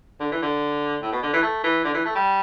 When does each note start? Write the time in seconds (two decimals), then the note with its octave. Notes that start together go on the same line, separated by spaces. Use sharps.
0.20 D3
0.32 E3
0.42 D3
1.02 A2
1.12 B2
1.23 D3
1.33 E3
1.42 A3
1.64 E3
1.84 D3
1.94 E3
2.05 A3
2.15 G3